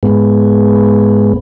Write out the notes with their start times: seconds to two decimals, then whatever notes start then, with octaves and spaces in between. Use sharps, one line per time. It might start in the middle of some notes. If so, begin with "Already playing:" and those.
0.03 G#2 G#3 B3